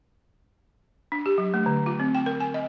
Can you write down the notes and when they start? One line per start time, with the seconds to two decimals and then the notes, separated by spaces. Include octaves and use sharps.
1.12 D4
1.26 G4
1.38 F#3
1.54 A3
1.66 D3
1.86 F4
2.00 C4
2.14 G5
2.26 A#4
2.40 G#5
2.54 D#5